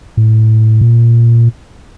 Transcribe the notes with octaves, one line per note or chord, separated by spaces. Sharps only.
A2
A#2